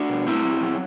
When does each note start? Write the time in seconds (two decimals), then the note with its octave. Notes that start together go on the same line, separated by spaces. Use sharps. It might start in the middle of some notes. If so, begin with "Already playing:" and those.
Already playing: D4 F#4
0.09 B2
0.27 A2 C4 E4
0.44 F#3
0.62 F#3